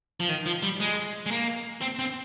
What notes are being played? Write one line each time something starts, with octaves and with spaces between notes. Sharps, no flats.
F3
D#3
F3
G3
G#3
G#3
A#3
C4
C4